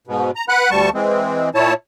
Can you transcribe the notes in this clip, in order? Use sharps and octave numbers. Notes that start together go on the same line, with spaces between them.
G#2 B2
A#5
B4 F#5 B5 F#6
D2 G3 A5 C#6
E3 G#3 C4
A#2 E4 C#5 A5